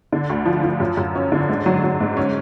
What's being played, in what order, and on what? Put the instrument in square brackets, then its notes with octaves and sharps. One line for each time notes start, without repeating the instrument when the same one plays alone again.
[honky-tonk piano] D3
D2
F3
F3
F#2
F#2
C#4
D3
G#2
F#3
F#3
G#2
C#4